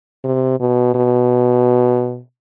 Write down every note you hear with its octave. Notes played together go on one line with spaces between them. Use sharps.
C3
B2
B2